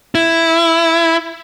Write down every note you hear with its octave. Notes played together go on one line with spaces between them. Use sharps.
E4